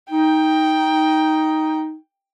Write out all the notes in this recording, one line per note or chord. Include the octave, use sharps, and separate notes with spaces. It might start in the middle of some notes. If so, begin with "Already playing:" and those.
D#4 G5